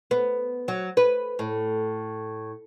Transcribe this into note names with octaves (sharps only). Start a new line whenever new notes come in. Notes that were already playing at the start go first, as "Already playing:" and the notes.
B3
F#3
B4
A2